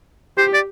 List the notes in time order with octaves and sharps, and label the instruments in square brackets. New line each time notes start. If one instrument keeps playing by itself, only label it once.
[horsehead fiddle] G4 [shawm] C5
[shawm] D5